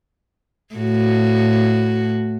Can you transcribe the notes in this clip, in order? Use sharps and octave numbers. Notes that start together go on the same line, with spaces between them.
A2 F#4